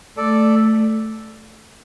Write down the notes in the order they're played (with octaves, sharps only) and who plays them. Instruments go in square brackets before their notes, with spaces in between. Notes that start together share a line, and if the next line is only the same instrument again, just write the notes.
[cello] A3 [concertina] A4 D5